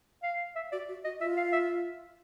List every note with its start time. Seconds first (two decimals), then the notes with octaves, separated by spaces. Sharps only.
0.24 F5
0.56 E5
0.72 F#4 D5
0.88 F#4
1.04 F#4 D#5
1.21 F4 E5
1.37 F5
1.53 E5